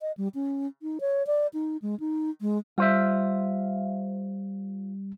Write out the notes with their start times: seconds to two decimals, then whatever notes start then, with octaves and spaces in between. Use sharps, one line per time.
0.01 D#5
0.17 G3
0.35 C#4
0.82 D#4
1.01 C#5
1.27 D5
1.54 D#4
1.82 G#3
2.00 D#4
2.41 G#3
2.78 G3 F4 C5 E5